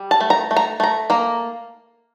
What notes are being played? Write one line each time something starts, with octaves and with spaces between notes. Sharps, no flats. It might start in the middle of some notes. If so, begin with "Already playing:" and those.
Already playing: G3
A5
A3
A#5
A3
A#5
A3 A#5
A#3 A#5